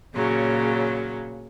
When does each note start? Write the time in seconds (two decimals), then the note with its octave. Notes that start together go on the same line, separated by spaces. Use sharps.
0.13 A#2 C#3 F#3